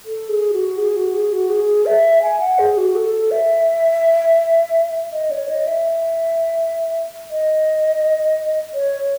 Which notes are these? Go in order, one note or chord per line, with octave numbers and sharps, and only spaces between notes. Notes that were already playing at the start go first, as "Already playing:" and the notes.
A4
G#4
F#4
G#4
F#4
G#4
F#4
G#4
E5
G#5
F#5
G#4
F#4
A4
E5
D#5
C#5
D#5
E5
D#5
C#5